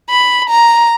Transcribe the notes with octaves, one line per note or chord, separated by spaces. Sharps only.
B5
A#5